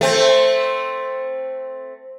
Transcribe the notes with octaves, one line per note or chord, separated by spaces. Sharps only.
A3 C4